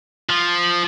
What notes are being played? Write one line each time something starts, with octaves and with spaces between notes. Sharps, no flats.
F3